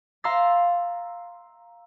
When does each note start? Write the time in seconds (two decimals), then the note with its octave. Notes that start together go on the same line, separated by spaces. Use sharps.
0.24 F5 A#5 C6 E6 A6